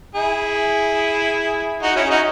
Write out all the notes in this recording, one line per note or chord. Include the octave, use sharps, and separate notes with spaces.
E4 G#4
D#4 F#4
C#4 E4
G#4
D#4 F#4